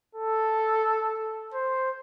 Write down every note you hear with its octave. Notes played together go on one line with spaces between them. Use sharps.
A4
C5